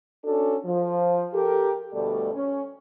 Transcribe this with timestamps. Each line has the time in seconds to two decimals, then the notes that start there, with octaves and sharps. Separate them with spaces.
0.24 C#4 D4 F#4 A4
0.66 F3
1.34 G4 A4 A#4
1.94 D2 B2 G3 A3 A4 D5
2.34 C#4